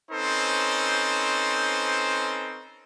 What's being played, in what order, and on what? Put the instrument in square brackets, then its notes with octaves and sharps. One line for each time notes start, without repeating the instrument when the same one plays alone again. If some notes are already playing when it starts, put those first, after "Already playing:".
[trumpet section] C4 C#4 D#4 A4 B4 C5